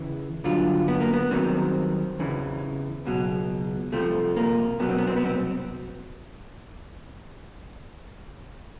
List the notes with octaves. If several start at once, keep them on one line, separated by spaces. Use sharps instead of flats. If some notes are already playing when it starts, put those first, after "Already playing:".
Already playing: E2 C#3 E3
G2 D3 F#3 F4
B3
A#3
B3
C2 C3 D#3 F#3 C4
E2 C#3 E3
C#2 B2 F#3
C2 C3 F3 A3
A#3
C2 B2 F#3 B3
C4
B3
C4
B3
C4